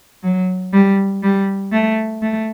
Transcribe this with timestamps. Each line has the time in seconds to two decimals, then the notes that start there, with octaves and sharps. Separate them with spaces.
0.24 F#3
0.73 G3
1.23 G3
1.73 A3
2.22 A3